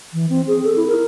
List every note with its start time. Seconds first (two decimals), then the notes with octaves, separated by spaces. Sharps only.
0.14 E3
0.29 C4
0.47 G#4
0.64 A4
0.76 E4
0.88 A#4